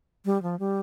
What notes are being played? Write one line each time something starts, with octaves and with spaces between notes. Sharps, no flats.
G3
F3
G3